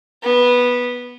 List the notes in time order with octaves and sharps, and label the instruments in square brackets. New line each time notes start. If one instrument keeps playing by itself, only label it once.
[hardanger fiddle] B3